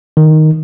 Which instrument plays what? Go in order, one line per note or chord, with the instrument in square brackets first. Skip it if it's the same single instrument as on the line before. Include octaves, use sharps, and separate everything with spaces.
[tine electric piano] D#3